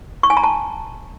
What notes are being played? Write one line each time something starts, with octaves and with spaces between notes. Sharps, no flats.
C#6
G#5
A#5
A5